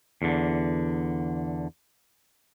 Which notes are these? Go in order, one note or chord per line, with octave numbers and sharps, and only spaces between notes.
E2 D3